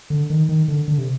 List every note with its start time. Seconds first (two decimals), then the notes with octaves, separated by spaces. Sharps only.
0.10 D3
0.30 D#3
0.49 D#3
0.68 D3
0.88 D3
0.98 C3